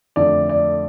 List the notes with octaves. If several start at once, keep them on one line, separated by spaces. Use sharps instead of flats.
F2 D3 A3 D5
D5